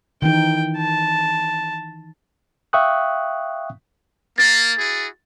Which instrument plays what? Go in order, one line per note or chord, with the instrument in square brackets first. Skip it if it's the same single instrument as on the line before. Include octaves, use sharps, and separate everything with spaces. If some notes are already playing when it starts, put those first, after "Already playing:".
[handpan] D#3 E3 D#4 [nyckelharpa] G5
[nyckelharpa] A5
[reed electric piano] E5 F5 G5 C#6 D#6 F#6
[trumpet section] A#3 [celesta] A6
[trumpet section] E4 F#4 G#4